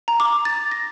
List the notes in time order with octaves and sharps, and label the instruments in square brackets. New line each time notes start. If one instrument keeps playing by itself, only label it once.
[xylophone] A#5
D6
A6
A#6